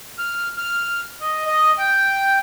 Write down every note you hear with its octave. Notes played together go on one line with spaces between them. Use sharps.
F6
F6
D#5
D#5
G5